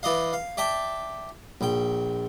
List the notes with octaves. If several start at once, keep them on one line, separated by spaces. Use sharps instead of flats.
E3 D5 D#5 F5
F5
D5 E5 G5 A5 D6
A#1 G5